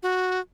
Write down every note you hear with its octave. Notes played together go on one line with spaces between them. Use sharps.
F#4